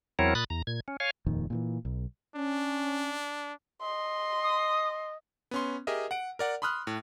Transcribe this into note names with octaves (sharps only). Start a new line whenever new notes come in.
E2 F#3 C4 E4 A#4 C#5
A#2 B5 D#6 F#6 A6
E2 A#5
A#2 G#6
C#4
C#5 F5 G#5
D#1 F2 A#2 D#3
A#2 D3 E3
B1
C#4 D4
D#5 C6
D#6
B3 C#4 C6
G4 G#4 A#4 D#5 E5
F#5 D7
A#4 D5 F#5
B5 C6 D#6 F6 F#6
A2